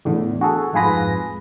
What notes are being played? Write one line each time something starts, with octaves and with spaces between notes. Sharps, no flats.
E2 A2 D3
F#4 G#4 A4
F2 G#2 F4 G#4 B4 A#6